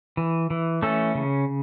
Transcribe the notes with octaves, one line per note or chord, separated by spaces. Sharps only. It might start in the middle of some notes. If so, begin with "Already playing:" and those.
E3
E3
A3 C#4 A4
C#3